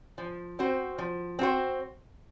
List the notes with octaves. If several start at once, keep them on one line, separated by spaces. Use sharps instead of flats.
F3
C4 F#4 C5
F3
C4 F#4 C5